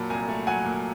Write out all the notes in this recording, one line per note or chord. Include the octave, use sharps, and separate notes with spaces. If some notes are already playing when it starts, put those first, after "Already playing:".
Already playing: A#2 F#3 A5 B5
C2 G#5 A#5
A3
F#3 F#5 G#5
A#2